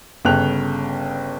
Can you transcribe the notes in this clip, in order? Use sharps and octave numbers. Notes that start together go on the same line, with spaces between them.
G1 C#3 A4 G5 F#6 F7